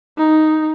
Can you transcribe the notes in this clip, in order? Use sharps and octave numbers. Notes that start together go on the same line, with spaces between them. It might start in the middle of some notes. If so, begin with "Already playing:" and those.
D#4